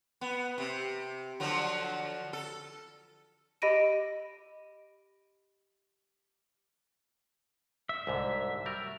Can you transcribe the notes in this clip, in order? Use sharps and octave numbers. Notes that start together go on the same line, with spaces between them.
B3
C3
D3 F3 F#3
A4
G4 D#5 B5 A#6 D7 D#7
E5
C2 G#2 D3
F#3 G3 A#4